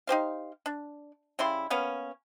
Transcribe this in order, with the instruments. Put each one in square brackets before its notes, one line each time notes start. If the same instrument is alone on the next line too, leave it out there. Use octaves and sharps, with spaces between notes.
[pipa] D#4 G4 C5 F5
D4
C#3 G3 E4 C6
A#3 B3 C#4 F5